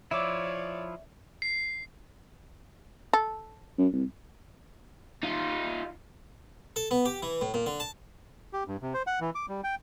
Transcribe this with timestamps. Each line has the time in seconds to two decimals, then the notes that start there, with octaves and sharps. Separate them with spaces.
0.11 F3 E4 C#5 D5 E5 D6
1.42 C7
3.13 A4
3.78 F#2
3.93 C2
5.23 D#4 F4
6.76 A4
6.91 B3
7.05 G4
7.22 E3
7.41 A2
7.54 A#2
7.66 D3
7.80 A5
8.53 G4
8.68 G2
8.82 C3
8.94 C5
9.07 F#5
9.21 E3
9.35 D6
9.49 G3
9.64 G5